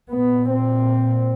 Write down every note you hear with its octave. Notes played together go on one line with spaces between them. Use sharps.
A#2 B3
C4